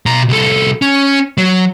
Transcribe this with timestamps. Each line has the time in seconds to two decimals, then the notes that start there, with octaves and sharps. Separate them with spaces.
0.06 B2 A#5
0.29 C2 A4
0.82 C#4
1.38 F#3